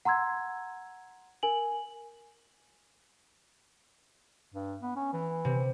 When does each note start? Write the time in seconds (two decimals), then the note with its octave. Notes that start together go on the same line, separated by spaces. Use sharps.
0.05 F#5 A#5 C6 E6 G#6
1.43 A#4 G#5 F#7
4.54 G2
4.82 B3
4.96 C#4
5.13 E3
5.45 C3